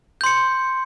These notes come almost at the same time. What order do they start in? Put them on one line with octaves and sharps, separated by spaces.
G6 C6 C#7